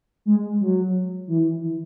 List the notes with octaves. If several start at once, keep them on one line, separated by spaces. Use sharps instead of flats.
G#3
F#3
E3
E3